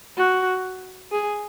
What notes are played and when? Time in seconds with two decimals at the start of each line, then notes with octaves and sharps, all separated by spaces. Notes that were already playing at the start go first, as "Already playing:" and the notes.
0.17 F#4
1.12 G#4